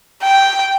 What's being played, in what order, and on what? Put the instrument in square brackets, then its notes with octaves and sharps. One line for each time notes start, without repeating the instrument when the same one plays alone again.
[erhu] G5